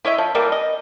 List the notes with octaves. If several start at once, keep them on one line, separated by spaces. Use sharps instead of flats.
E4 C#5 D#5 E5
F3
E3 G3 A3 A#3
D#5